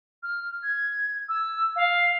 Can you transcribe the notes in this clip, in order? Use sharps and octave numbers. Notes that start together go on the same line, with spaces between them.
F6
G#6
E6
F5